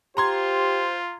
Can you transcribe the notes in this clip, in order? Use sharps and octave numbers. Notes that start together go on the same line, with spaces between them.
F4 G4 C5 A#5 C6 G#6